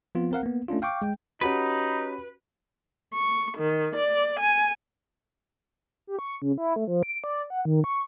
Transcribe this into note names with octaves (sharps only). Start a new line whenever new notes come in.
F3 B3 C4 F4
C4 A#4 F5 F#5
A#3 B3
A3 C#4 D4 F4
F5 G5 C#6 D6
G#3 G5
C#4 D#4 F#4 G4 B4
C#6
D#3
D5
G#5
G4
C#6
C#3
E4
A3
F3
D7
D5
F#5
D#3
C#6